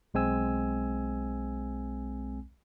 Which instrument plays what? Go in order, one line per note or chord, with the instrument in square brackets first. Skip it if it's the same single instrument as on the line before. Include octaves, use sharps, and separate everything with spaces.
[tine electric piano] B1 G#3 C4 G#5 E6